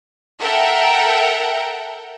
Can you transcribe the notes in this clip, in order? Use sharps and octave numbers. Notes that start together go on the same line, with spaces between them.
A4 A#4 E5 F#5 G5